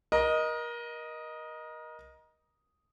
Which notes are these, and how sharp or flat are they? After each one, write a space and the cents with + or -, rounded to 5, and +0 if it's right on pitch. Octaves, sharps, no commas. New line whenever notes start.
A#4 +30 D#5 +0